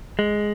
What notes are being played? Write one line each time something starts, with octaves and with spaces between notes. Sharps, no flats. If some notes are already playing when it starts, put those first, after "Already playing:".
G#3